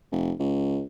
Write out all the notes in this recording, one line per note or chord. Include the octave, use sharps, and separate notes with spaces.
F1
C#2